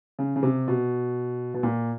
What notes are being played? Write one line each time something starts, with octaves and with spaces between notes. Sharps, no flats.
C#3
C#3
C3
B2
B2
A#2